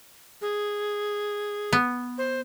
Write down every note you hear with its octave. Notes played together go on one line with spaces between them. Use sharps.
G#4
B3
C5